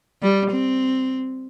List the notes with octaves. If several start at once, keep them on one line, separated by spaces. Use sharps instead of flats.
G3
C4